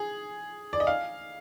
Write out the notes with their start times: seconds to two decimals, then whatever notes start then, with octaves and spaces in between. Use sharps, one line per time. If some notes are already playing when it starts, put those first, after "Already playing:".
Already playing: G#4
0.73 D5
0.80 D#5
0.87 F5